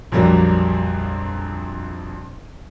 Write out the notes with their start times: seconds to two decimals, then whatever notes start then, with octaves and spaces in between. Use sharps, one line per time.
0.12 A#1 F2 F#3 G3 A#3